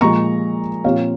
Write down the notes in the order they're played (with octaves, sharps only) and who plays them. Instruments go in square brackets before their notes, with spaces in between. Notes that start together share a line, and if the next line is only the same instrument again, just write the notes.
[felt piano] A#2 F3 G#3 A#5 C#6
A#2 F3 C4 C#5 F5